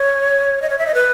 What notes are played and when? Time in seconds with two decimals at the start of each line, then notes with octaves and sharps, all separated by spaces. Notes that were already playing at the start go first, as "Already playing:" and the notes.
Already playing: C#5
0.62 D#5
0.70 C#5
0.79 E5
0.87 D#5
0.95 B4